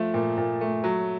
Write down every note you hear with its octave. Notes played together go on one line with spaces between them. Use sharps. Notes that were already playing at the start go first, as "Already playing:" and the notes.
Already playing: F3 A3
A#2
A#2
A3
F#3